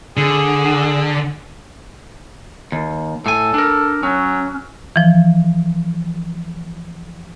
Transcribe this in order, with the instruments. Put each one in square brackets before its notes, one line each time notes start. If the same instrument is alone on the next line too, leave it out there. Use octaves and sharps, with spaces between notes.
[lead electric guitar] D3 [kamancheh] G#4
[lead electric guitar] D#2
[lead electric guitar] A2 G#5 [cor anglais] A4
[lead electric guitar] D4 A#4
[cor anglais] F#3 [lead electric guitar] C#4
[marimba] E3 F3